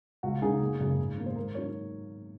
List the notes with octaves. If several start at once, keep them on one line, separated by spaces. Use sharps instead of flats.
C#2 F#4
C#3 G#3 D#4 G#4
F#1
F#2 C#3 G#3
G#2
D#3 A#3
C5
G#2 A#4
F#3 C4 D#4 C#5